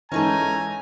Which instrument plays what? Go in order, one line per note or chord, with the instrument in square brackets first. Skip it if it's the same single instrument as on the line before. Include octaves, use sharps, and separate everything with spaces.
[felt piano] G#2 E3 [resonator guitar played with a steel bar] C#4 D#4 A4 [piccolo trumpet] G#5 [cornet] A#5